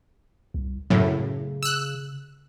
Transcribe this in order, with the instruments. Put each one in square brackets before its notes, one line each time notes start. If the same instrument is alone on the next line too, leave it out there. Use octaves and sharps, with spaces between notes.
[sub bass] C2
[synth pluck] F#2 A2 [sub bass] C#3
[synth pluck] E6 F#6